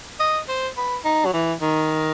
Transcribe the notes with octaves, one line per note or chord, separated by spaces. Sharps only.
D#5
C5
B4
D#4
F#3
E3
D#3